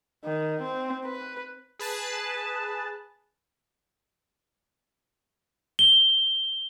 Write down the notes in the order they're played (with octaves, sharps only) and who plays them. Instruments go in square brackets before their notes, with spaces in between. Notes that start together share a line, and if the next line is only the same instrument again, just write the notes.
[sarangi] D#3
C4
B4
[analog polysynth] G#4 B4 A5
[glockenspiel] G7